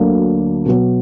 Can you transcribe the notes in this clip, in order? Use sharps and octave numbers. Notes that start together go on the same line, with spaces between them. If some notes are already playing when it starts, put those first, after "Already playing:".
Already playing: D2 D3 F#3 A#3 D4
B2 F#3 B3